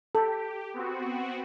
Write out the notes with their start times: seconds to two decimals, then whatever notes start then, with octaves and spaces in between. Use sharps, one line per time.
0.15 G4 A4
0.74 B3 C4 F#4